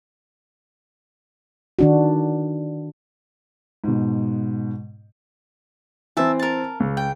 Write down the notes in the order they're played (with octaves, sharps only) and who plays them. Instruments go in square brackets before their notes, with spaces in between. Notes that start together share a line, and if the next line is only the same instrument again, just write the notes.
[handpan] D#3 D4 F#4
[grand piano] G#2 B2
[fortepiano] E3 C4 [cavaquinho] E5 A5
[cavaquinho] A#4 A5
[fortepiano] C#2
[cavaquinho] G5